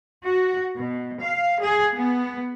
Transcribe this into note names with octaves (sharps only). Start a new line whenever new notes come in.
F#4
B2
F5
G#4
B3